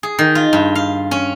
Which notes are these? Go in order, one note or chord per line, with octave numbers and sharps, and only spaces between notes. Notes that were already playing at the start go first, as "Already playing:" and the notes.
G#4
D#3
F4
G2
F5
C#4